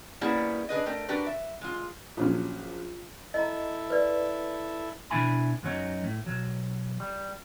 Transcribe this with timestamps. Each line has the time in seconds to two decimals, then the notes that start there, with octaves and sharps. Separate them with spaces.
0.21 G3 A#3 B3 C#4 E4 G#4
0.69 D4 G#4 B4 D#5
0.86 A3 A#4 G5
1.08 D4 F#4 G4 A#4 B4
1.27 E5
1.61 G#3 F4
2.17 A#1 F#3 C#4 F6
3.34 E4 A4 D#5 A#5
3.90 B4 D5
5.10 B2 D4 E4 G#5 B5
5.63 F#2 F#3 C#4 D#4
6.04 A2
6.26 B1 F#3
7.00 G3